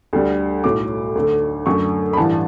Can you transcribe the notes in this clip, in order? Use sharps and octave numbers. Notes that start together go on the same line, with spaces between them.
D2 D3 G3
B1 A2 F#3 A3 D6
D2 D3 A3
F#2 D3 A3 C#6
B5
A1 G2 E3 A5